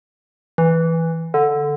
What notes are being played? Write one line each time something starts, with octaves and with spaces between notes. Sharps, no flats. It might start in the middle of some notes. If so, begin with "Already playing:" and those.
E3
D3